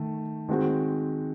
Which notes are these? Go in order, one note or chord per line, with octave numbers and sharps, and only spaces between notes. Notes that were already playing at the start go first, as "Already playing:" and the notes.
Already playing: D#3 A3
D#3 G#3 C4 F#4